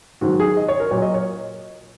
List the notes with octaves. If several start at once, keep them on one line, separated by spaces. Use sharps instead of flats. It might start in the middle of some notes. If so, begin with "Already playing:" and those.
G#2 D#3 F#3 F#4
G#4
D#5
C#5
A#4
A#2 F#3 C#5
D#5
C#5